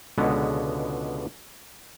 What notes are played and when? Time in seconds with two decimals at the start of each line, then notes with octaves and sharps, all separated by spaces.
0.18 C#2 B2 D3 G#3 B3